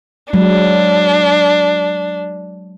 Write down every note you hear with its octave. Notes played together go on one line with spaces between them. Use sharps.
F#3 G#3 D4